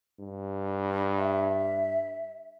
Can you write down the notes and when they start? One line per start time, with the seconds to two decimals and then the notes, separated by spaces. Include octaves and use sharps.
0.19 G2
1.17 E5